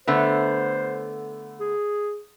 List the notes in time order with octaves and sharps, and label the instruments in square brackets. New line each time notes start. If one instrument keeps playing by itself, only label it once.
[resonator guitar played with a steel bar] D3 A3 B3 [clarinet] C5
[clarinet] G#4